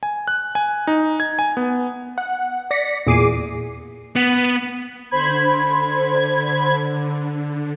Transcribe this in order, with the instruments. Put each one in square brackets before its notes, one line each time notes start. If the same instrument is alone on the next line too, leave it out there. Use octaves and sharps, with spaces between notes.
[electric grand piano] G#5
F#6
G#5
D#4
G#6
G#5
B3
[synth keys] F#5
D5 A#6 B6 C#7
E2 A#2 G#4 D6 C7 D#7
[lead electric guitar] B3
[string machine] D3 [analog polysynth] C5 B5 G#6